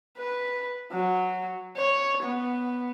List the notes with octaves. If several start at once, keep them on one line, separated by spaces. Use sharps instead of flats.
B4
F#3
C#5
B3